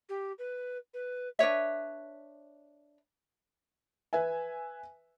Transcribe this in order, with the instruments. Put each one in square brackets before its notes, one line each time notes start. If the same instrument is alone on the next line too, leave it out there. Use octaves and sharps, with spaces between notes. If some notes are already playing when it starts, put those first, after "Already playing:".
[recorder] G4
B4
B4
[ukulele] D4 B4 C#5 E5
[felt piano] B4 E5 G#5